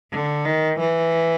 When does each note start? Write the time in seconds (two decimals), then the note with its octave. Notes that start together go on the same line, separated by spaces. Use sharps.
0.12 D3
0.45 D#3
0.80 E3